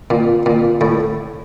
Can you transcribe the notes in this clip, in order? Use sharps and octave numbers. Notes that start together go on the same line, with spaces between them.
A#2
A#2
A2